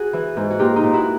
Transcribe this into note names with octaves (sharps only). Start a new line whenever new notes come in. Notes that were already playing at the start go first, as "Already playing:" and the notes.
Already playing: F#4 G#4
E3
G#2
F#4
A#2 F4 G4
D#4 F4
A#2
E4 F#4